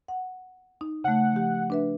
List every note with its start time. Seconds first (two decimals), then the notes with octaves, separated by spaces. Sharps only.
0.08 F#5
0.81 D#4
1.04 C#3 A3 F#5
1.32 F3 G4
1.70 D4 B4 E5